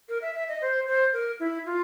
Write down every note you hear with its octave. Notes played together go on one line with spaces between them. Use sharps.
A#4
E5
E5
D#5
C5
C5
A#4
E4
F4